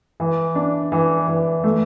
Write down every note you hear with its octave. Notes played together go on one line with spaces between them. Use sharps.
E3
D4
E3
E3
A3